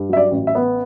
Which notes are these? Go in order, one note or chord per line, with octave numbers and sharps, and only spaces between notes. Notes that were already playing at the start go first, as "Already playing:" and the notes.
Already playing: G2
F#3 E5
D5
A1
E5
B3